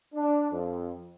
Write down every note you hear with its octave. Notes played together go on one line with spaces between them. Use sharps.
D4
F2